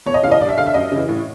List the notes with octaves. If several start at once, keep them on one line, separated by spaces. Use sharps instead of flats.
E2 C#5
D#5
C#3 E3 F5
D#5
G2 D5
E5
D3 F5
E5
F#2 D#5
C#3 E3
A2